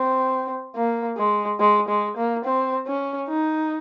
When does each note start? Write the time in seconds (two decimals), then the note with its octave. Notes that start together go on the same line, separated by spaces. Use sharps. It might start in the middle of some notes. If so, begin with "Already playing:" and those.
Already playing: C4
0.76 A#3
1.17 G#3
1.60 G#3
1.89 G#3
2.17 A#3
2.45 C4
2.87 C#4
3.29 D#4